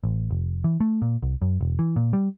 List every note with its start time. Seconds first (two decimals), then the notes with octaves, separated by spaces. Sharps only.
0.04 A1
0.31 F1
0.64 E3
0.80 A3
1.02 A#2
1.22 C2
1.42 F#2
1.61 E1
1.79 E3
1.96 A#2
2.13 G3